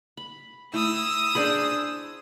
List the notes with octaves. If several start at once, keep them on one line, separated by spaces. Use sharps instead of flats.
B5
A3 E4 D#6 E6
D4 G#4 C5 D5 G5 B5